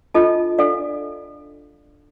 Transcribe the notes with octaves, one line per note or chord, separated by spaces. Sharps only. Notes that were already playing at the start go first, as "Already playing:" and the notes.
D4 F4 A4 D#5 A5
D4 A4 D5 F5